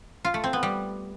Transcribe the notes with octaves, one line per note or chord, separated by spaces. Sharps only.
F4
A3
C4
B3
G3